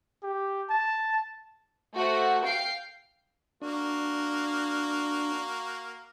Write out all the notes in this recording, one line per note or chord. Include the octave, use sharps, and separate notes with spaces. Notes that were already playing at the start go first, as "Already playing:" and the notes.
G4
A5
A3 F#4 C5 F#5
F5 G5 C7 D7
A#3 D4 F#4